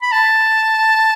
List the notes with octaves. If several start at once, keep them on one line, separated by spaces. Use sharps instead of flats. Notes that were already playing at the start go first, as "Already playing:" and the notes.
B5
A5